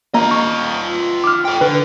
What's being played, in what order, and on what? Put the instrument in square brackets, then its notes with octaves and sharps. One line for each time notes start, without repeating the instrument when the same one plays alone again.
[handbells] A#3 A#5 [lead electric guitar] F4 D#5
[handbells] C#6
D6 F6
[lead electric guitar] A4 G5
[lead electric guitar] D3 [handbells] B4